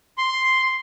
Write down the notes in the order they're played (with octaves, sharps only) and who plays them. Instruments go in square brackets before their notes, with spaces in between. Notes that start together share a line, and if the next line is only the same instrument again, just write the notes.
[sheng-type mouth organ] C6